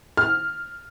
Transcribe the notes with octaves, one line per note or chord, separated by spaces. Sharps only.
F6